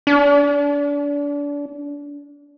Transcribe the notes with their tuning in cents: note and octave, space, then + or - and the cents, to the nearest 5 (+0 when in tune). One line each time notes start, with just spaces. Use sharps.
D4 -30